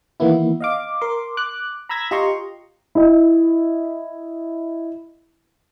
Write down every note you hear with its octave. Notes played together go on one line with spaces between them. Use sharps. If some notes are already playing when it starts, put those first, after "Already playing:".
D#3 E3 A#3 B3 E4
D#5 F5 D6
A#4 C6 D6
D6 F#6
A#5 B5 E6 G#6 A#6
F4 G4 D#5 A#5 C6 C#6
E4 D#5